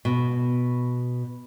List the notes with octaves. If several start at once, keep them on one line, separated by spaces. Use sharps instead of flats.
B2